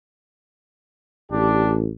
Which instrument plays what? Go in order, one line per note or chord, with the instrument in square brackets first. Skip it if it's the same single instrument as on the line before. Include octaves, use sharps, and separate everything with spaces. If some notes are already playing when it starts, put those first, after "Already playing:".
[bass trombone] A1 [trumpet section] D4 G4